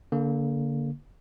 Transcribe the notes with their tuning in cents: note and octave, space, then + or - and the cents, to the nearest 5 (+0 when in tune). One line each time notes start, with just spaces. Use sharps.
D3 -30 A#3 +0